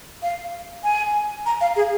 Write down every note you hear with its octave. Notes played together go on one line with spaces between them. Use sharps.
F5
G#5
A#5
F5
G#4